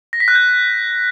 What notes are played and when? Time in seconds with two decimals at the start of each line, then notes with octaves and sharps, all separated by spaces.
0.13 A#6
0.20 B6
0.28 F#6
0.35 G6